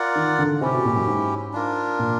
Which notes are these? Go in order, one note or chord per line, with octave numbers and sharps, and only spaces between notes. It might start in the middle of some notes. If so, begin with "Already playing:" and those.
Already playing: F4 A#4 D5 F#5
D#3
D3
C3 C#4 E4 G4
B2
A#2
F#2
G#2
D4 F4 A#4
A#2